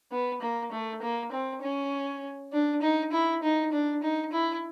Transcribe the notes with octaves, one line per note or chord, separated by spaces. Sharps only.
B3
A#3
A3
A#3
C4
C#4
D4
D#4
E4
D#4
D4
D#4
E4